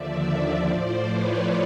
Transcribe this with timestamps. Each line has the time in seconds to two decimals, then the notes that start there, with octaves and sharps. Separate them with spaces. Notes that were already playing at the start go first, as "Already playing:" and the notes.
Already playing: D#2 D3 F3 D5 E5
0.67 A2 F3 C5 D5
1.06 B4 C#5